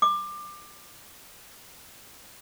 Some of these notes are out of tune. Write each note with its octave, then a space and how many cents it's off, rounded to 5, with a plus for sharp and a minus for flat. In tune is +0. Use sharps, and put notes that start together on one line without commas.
D6 +25